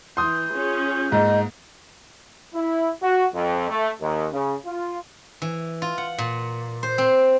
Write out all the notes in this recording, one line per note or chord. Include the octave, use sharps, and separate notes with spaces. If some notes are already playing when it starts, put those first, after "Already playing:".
E3 C6 D#6 G6
C#4 F4 G#4
G#2 A#3 D#5
E4
F#4
F2
A3
D#2
C#3
F4
E3
F4
F#5
A#2
C5
C4